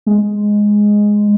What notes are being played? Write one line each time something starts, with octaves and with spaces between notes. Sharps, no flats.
G#3